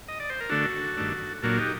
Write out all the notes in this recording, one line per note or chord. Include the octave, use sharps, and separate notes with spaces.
D#5
D5
C5
A#4
D3 A3 D4 F#4 A4
G2 D#3 A3 D4
A#2 F#3 A#3 D4 F#4 A4
D#4 G4